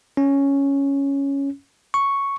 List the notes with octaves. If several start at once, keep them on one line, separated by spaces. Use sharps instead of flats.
C#4
C#6